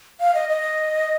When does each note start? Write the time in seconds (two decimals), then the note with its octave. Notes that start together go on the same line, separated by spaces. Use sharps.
0.20 F5
0.34 D#5
0.49 D#5